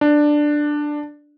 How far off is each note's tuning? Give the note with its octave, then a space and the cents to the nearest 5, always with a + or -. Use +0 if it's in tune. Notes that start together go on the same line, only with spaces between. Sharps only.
D4 +10